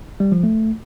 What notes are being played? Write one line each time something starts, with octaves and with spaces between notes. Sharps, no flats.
G3
F3
A3